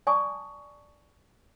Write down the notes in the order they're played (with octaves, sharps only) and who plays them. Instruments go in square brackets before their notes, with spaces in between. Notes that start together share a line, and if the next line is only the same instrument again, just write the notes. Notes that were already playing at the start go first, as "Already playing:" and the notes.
[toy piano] D5 G#5 A5 C#6 D#6